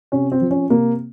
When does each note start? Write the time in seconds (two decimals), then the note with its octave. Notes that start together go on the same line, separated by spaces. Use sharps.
0.12 C3 C#4
0.32 C4
0.41 F3
0.51 C#4
0.70 C3 A#3